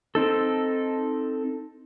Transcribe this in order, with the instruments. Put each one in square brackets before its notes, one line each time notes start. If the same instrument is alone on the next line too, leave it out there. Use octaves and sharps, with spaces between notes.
[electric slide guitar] C4 D#4 A4